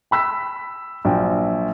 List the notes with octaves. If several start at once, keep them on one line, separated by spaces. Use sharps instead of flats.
G5 B5 E6 B6
A#1 F#3 F4 G5